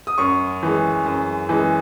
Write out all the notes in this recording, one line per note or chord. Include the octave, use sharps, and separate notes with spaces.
D#6
F#2 C#6
E3 G#3
F#2
E3 G#3